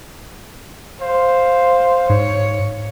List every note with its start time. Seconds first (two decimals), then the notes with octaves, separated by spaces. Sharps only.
1.01 C5 F5
2.10 G#2 C#5